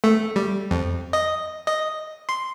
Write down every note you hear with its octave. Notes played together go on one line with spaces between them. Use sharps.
A3
G3
F2
D#5
D#5
C6